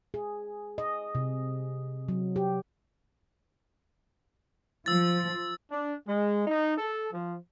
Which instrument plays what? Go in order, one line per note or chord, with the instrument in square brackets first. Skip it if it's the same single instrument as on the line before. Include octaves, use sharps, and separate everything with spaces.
[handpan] G#4
D#5
C3
F#3
G4
[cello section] F3 [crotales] E6 A6
[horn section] D4
G#3
D#4
A4
F3